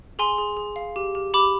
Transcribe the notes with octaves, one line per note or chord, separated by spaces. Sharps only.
G#4 G#5 C6
G#4
G#4
F5
G4
G4
G4 B5 D6